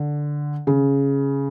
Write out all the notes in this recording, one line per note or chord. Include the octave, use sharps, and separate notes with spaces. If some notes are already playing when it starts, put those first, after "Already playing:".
Already playing: D3
C#3